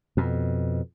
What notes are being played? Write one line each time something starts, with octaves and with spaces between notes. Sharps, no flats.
F2 B2